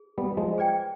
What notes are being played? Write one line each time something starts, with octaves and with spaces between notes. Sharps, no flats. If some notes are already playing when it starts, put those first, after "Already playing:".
Already playing: G#4
G3 B3
F3 G#3
G#4 B4 D5 G5